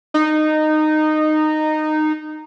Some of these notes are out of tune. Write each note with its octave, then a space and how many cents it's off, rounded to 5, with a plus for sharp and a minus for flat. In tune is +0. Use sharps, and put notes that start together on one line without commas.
D#4 -15